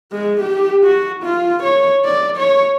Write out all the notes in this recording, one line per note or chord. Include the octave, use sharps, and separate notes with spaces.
G#3
G4
F#4
F4
C#5
D5
C#5